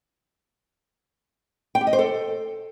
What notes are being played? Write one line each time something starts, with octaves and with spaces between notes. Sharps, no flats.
G5
G4
D#5
C5
A4